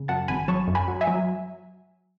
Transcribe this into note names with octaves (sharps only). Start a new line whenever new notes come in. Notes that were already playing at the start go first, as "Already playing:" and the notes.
Already playing: C#3
F#2 F#5 A5
G#1 G#5 B5
F#3 A5 C#6
F#2
G#5 B5
F#3
E5 G#5
F#3